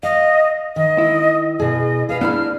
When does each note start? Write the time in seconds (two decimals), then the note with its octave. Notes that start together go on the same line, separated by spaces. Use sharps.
0.03 D#5 F5
0.76 D#3 D#5
0.98 E4
1.60 B2 G#4 D#5
2.09 G#4 B4 F5
2.21 B3 D4 E4 B5 F6